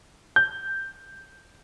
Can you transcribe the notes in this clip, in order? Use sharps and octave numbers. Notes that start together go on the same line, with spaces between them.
G6